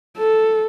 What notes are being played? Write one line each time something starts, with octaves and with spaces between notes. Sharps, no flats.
A4